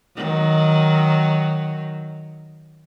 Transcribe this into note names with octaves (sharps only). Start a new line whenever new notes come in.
D#3 F#3